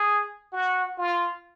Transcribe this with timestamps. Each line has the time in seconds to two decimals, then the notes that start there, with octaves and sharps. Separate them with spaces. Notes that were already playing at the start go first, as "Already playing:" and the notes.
Already playing: G#4
0.53 F#4
0.98 F4